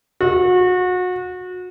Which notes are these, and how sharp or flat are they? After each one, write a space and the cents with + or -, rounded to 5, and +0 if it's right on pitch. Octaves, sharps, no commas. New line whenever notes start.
F#4 -30